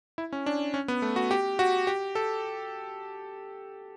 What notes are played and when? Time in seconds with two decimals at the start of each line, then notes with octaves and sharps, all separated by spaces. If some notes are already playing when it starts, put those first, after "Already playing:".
0.18 E4
0.33 C#4
0.46 D4
0.74 C#4
0.88 B3
1.02 A3
1.16 F#4
1.31 G4
1.59 F#4
1.87 G4
2.15 A4